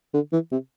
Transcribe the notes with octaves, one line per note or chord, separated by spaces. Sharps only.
D3
E3
C3